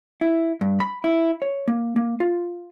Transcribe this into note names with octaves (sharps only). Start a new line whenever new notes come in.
E4
G2
B5
E4
C#5
A#3
A#3
F4